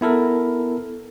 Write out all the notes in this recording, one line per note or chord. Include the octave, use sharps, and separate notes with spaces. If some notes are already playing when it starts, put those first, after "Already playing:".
B3 E4 A4 A#4